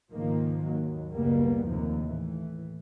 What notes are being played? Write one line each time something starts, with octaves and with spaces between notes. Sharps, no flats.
C#2 G#2 D#3 F3 A#3
D#2 F#3
F#1 C#2 B2 G3 A#3 B3
D#2 A2 C3 F3 A#3
A2 E3